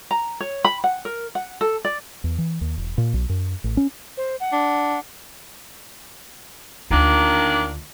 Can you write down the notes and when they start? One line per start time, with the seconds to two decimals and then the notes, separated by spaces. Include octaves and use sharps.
0.11 A#5
0.40 C#5
0.64 B5
0.84 F#5
1.05 A#4
1.35 F#5
1.61 A4
1.84 D5
2.24 E2
2.38 E3
2.61 D#2
2.78 E1
2.98 A#2
3.14 B1
3.29 F#2
3.64 A1
3.77 C#4
4.17 C5
4.40 F#5
4.52 D4
6.90 D2 D#3 A#3 D4 F4